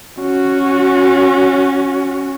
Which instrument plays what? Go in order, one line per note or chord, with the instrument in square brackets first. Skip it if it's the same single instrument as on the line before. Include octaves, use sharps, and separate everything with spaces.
[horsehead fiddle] C#4 F#4